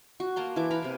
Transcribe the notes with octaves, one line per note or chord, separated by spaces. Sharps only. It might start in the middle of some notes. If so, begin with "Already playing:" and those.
F#4
A#3 A5 A#5 C6
E3 E4 A5 D6
A#4 F5 A#5 B5
C3 A#3